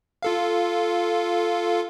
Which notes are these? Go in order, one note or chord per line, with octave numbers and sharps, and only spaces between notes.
F4 A4 F5